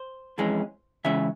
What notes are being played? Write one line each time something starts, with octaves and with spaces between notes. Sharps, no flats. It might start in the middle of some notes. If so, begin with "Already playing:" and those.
Already playing: C5
F2 E3 G#3 C#4
C#3 E3 G#3 C#4 E5